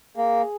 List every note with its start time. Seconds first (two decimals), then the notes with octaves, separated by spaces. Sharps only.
0.17 A#3 G#4